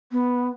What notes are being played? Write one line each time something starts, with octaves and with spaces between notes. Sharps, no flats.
B3